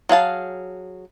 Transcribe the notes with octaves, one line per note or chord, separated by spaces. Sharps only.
F#3 G#4 F5 A5